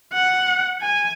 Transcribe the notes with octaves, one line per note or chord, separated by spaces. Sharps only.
F#5
G#5